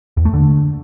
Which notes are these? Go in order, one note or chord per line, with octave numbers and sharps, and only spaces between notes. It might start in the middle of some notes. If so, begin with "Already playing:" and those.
E2
A3
D3